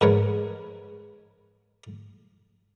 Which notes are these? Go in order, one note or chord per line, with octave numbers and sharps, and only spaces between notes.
G#2 A#4 B4 C#5